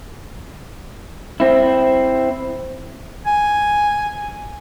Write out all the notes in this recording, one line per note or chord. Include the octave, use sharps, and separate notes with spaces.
C4 E4
G#5